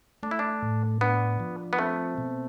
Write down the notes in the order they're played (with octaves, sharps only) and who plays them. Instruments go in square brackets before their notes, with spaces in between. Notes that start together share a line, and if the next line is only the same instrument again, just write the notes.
[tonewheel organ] A3 [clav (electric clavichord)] D4
[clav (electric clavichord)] E4
D4
[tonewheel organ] A2
[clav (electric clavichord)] B3 [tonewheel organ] D4
[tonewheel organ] F3
[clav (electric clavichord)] B3
[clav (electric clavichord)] A3 [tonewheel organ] C4
[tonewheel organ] B2